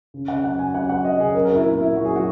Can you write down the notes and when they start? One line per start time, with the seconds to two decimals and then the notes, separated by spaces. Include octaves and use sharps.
0.14 C#3
0.28 C#3 F#5
0.44 F#3 F#5
0.59 C#3 G#5
0.74 F#3 F#5
0.89 F#3 F#5
1.05 F#3 D#5
1.19 C#3 G#4
1.34 F#3 A#4
1.45 A#4
1.50 F#3 E4
1.65 A#2 E4
1.80 A#2 E4
1.96 F#3 F#4
2.05 G#4
2.11 F#3 F#4